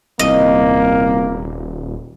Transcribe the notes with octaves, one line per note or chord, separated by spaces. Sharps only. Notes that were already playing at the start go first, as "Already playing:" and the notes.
D#1 C2 A#3 D#5